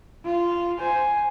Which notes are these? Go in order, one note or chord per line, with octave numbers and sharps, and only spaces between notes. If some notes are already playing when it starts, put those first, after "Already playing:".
F4
C5 G#5